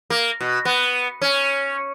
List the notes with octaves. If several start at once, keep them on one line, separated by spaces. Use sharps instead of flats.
A#3
B2
B3
C#4